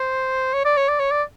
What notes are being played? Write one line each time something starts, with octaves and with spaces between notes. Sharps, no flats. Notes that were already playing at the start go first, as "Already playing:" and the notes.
Already playing: C5
C#5
D5
C#5
D5
C#5
D5